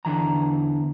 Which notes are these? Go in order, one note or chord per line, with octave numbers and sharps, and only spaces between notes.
E2 D3 E3 A#5